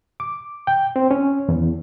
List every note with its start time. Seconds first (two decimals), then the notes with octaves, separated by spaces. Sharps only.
0.20 D6
0.67 G5
0.96 C4
1.11 C#4
1.49 E2